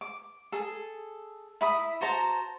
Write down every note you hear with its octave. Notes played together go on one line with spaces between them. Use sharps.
D6
G#4 A4
E4 B5 D#6
F#4 C5 A5 A#5